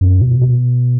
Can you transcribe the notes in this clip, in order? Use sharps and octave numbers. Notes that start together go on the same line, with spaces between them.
F#2
B2
B2